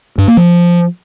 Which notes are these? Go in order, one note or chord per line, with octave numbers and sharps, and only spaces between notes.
G2
A#3
F3